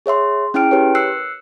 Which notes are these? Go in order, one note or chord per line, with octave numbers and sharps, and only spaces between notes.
G#4 C#5 E5 C6
C#4 E4 G#4 G5 F6 D7
G4 A#4 B4 C#5
E6 F#6 C7 C#7